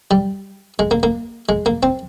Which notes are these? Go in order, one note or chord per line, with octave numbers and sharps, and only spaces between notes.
G3
G#3
A#3
A#3
G#3
A#3
C4